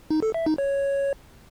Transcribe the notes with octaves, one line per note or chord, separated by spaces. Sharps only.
D#4
A4
E5
D#4
C#5